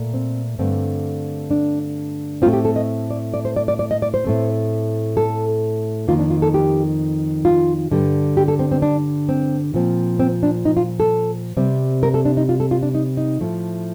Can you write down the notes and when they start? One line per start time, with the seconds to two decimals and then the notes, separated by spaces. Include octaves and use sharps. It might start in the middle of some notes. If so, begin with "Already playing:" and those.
Already playing: A#2 A3
0.14 C4
0.59 G2 D3 A3 C4
1.51 D4
2.42 A2 A3 C4 F4
2.53 G4
2.65 A4
2.76 D#5
3.11 D5
3.34 D5
3.45 C5
3.56 D5
3.68 D5
3.79 D5
3.91 D#5
4.02 D5
4.14 C5
4.25 A2 A3 C4
5.17 A4
6.08 F2 D#3 A#3 F4
6.19 D4
6.30 F4
6.42 A4
6.54 G4
7.45 F4
7.91 G2 D3 G3
8.37 G4
8.48 A4
8.59 C4
8.72 C4
8.82 D4
9.29 C4
9.74 A#2 F3 C4
10.19 C4
10.43 D4
10.65 D#4
10.77 F4
11.00 A4
11.57 C3 G3 C4
12.03 A#4
12.14 A4
12.25 D4
12.37 D#4
12.49 F4
12.60 A4
12.71 F4
12.83 D4
12.95 D#4
13.17 D#4
13.40 A2 F3 A3